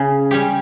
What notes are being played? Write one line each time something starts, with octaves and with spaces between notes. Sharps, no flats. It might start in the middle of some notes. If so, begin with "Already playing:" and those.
Already playing: C#3
G3 C#4 G4